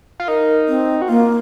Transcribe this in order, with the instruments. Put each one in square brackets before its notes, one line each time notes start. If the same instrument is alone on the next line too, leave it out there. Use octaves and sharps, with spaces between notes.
[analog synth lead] F4
[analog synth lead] D#4 [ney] A#4
[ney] C4
[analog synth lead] F#4
[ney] A#3 [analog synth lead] F4